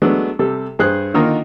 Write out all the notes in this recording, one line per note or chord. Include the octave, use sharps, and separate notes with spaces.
F#3 G#3 A3 B3 D4
C3 G3 A4
G2 G#4 C5 F#6
D3 D#3 A#3 D#4 F4 A#4